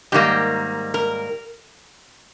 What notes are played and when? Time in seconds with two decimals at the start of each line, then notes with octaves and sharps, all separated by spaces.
0.12 G#2 D#3 G3 A#3 G4
0.94 A#4